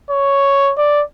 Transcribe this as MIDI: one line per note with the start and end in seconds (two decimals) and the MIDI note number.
0.10 0.72 73
0.78 1.02 74